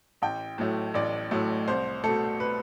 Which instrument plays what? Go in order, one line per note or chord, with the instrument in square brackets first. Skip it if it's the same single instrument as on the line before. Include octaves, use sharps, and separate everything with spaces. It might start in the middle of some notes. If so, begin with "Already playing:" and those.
[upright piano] A1 G5
A2 F#3 A3
A1 D5
A2 F#3 A3
C2 C5
B2 A3 A4
B4